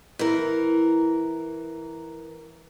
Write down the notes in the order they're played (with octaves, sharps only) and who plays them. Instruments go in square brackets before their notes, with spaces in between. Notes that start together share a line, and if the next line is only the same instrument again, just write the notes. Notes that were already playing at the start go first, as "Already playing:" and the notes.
[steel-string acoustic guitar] E3 A#4